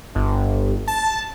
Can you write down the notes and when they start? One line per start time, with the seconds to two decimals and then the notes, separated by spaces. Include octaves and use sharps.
0.15 G1
0.88 A5